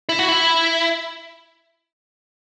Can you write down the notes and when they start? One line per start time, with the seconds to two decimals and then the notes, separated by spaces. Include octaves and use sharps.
0.09 E4
0.19 F#4
0.28 E4